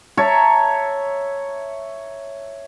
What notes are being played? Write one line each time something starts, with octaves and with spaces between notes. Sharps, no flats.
C#5 E5 A5 A#5